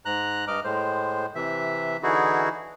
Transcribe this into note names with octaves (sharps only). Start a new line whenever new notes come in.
G#2 A#5 F#6
G2 D#5 D6 F6
A2 G#3 C5
C3 E3 E5
D3 E3 D#4 E4 F#4 G#4